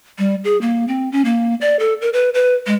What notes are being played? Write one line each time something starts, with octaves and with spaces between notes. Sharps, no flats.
G3
G#4
A#3
C4
C#4
A#3
D5
A4
A#4
B4
B4
G#3